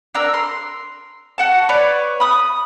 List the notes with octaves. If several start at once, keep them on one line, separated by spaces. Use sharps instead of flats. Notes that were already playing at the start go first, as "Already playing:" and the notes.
D4 A#4 E6
C6
F#4 F#5 A5
B4 C#5 D5
B5 D#6